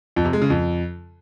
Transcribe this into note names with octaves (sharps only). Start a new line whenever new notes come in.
F2
C3
G#3
C#3
F2